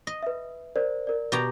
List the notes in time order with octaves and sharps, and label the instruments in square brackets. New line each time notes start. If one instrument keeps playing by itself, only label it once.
[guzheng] D#5
[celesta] B4 E5
A#4 C5 D5
A#4 D5
[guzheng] B2 G4 A#5